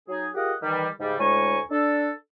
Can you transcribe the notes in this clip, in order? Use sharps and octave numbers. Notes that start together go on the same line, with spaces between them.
F#3 D#4 G#4
F4 G4 G#4 A#4 D#5 F#5
D#3 E3 G3
G#2 C#3 G3
D2 A2 G#3 G#5 A#5 C#6
D4 A4